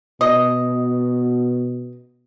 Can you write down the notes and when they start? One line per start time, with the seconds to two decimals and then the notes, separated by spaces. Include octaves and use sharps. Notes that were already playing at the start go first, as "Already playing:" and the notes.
0.21 B2 D#5